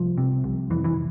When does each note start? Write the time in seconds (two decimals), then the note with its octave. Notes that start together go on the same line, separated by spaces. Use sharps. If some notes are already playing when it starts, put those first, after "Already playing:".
Already playing: C2 F3
0.18 C3
0.44 C2
0.70 F2 E3
0.84 E3